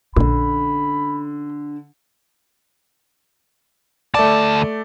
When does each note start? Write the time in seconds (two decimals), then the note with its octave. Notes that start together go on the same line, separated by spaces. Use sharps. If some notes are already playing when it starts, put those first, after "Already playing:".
0.16 A#1 A#2 D3 C#4 B5
4.14 D2 A3 D5 A5